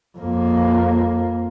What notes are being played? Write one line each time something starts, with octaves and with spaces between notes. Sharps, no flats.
F2 A#3